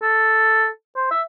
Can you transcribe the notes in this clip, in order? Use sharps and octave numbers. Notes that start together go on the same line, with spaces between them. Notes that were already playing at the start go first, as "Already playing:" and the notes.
A4
C5
E5